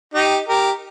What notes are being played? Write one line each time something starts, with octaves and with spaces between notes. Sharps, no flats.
D#4 G4
G4 A#4